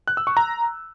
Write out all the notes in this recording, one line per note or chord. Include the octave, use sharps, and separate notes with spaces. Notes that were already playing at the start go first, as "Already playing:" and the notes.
F#6
E6
C#6
A#5